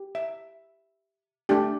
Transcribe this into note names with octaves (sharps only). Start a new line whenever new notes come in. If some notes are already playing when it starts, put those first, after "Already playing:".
Already playing: G4
E5
A3 D4 G4